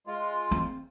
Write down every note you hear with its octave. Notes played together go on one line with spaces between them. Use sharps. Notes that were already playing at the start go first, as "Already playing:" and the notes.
G#3 F4
C4